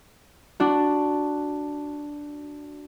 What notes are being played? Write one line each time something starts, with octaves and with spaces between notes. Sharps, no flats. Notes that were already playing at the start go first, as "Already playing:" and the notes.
D4 F#4